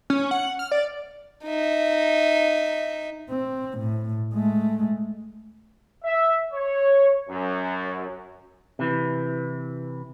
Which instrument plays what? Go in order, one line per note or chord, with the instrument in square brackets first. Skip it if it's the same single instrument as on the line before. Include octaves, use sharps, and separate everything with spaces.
[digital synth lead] C#4
F#5
F6
D5
[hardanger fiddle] D#4 E5
[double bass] C4
A2
G#3 A3
[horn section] E5
C#5
F#2
[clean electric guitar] C3 E3